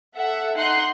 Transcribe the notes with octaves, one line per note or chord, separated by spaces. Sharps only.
A4 E5 F#5
D#4 F#5 C6 F#6